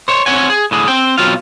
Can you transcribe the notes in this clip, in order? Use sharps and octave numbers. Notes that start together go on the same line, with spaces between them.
C5 C#5
C4 C#5 F#5 G#5
G#4
A2 D3 G#4
C4 G5
B2 F#3 C4 F4 F5